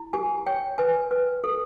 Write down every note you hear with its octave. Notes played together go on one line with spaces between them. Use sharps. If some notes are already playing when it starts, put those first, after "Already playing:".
Already playing: E4
G4 G#5
C#5 G5
B4 G#5
B4
A4